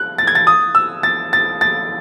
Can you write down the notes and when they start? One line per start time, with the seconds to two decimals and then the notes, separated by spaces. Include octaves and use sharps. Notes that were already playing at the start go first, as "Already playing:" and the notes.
Already playing: F#6
0.18 A6
0.27 G#6
0.35 A6
0.47 D#6
0.75 E6
1.03 A6
1.33 A6
1.61 A6